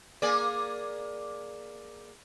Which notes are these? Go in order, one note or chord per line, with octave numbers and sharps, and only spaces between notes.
A#3 G#4 D5